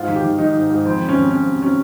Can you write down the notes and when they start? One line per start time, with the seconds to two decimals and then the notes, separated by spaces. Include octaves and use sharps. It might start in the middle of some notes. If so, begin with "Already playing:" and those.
Already playing: G#2 F4
0.08 D#3
0.15 G4
0.24 D#3
0.38 D#3 D#4
0.55 G#2
0.70 G#2
0.85 F2 C4
1.00 D#3
1.09 C#4
1.17 F2
1.31 F2 C#4
1.47 C3
1.62 C3 C#4